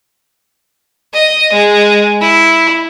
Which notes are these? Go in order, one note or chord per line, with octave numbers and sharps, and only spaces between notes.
D#5
G#3
E4